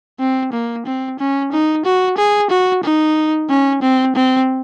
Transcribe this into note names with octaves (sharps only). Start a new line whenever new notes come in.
C4
A#3
C4
C#4
D#4
F#4
G#4
F#4
D#4
C#4
C4
C4